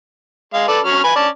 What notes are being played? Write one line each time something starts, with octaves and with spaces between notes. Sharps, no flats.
G#3 F5
A4 B4 D5
F#3 C#4 F6
B4 G#5 B5
C#4 D5 A5